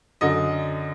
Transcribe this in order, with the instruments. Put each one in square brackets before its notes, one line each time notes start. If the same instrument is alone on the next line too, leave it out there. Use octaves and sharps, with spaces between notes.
[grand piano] F#2 D3 D#5